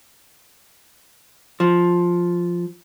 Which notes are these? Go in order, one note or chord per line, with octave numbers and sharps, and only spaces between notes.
F3